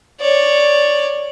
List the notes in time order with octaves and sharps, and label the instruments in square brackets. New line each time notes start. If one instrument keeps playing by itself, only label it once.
[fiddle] C#5 D5